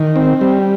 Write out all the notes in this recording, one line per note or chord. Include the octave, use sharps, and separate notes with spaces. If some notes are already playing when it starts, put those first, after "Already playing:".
Already playing: D#3
C4
G3